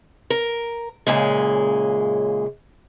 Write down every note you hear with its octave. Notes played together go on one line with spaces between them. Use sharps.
A#4
F#2 A#2 C#3 G#3